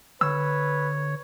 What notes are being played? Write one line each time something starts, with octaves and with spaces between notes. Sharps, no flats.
D3 B4 C#5 E6